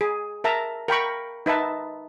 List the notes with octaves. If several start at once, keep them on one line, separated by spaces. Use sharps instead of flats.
G#4
A#4 E5 A5 A#5
A#4 G5 B5 C#6
D#4 B4 E5 A5